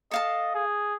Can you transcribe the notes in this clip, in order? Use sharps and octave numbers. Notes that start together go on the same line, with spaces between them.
A4 D#5 F5 A5
G#4